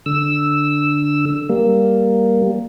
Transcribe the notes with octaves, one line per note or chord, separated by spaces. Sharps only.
D3 E6
G3 A#3